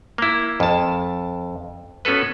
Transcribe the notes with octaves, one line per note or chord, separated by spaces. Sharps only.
A#3 E4
F2 A5
B3 C#4 F#4 A4 B4